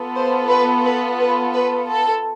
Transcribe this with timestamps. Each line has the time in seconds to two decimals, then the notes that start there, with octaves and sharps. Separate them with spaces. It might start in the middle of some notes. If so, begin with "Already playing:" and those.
Already playing: B3 F4 A4
0.15 C5
0.50 B4
0.85 B4
1.19 B4
1.54 B4
1.89 A4